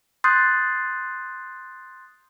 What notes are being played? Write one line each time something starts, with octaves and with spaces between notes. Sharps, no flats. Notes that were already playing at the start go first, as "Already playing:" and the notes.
C6 D#6 F#6 G6 A6 C7